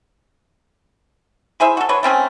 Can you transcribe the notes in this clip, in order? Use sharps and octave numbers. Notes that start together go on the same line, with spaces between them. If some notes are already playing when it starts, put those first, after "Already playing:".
E4 G#4 C5 E5
F#4 A4
D3 B4 C#5
A3 C4 C#4 G#4